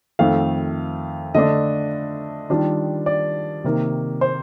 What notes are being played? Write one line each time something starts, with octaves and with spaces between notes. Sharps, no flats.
F2 D#3 A3 F5
D3 A3 D4 D#5
D#3 G3 D4 F4
D5
C3 D#3 A#3
C5